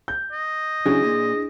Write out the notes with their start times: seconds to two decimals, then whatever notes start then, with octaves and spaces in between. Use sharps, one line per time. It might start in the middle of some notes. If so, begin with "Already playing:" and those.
0.08 G6
0.32 D#5
0.86 C#3 F#3 D4 E4 G#4
1.04 A#2